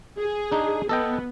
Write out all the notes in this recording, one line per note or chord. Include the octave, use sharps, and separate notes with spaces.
G#4
D4 D#4
B3 A4 D#5 G5